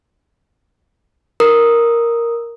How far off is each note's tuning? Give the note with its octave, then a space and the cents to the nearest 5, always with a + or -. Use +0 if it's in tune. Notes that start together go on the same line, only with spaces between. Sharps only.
A#4 +0 D#6 +0